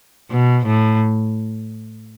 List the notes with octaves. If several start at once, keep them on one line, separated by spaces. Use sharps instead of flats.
B2
A2